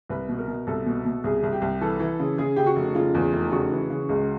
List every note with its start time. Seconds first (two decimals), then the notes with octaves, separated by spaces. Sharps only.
0.10 C2 B4
0.29 B2
0.38 A#4
0.48 B2
0.67 C2 A4
0.86 B2
1.05 B2
1.24 C2 G#4
1.43 C2
1.52 G4
1.62 C2
1.81 E3 A4
2.00 E3
2.20 C#3
2.38 C#3 G#4
2.56 C#3 G4
2.66 F#4
2.76 F1
2.95 C#3 F4
3.15 E2
3.33 F1
3.52 C#3 F#4
3.71 E3
3.90 C#3
4.09 C#2